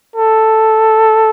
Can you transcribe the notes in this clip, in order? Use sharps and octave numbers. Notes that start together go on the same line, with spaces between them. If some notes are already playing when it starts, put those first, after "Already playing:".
A4